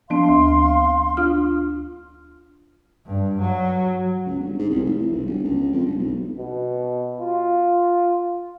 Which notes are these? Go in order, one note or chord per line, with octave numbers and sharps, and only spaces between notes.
F3 B3 D4 F5 C6
D2
D4 F4 F6
G2
F#3
C#2
G1
G#2
C2
F1
E3
B1
G1
C#2
F2
G1
B1
B2
F4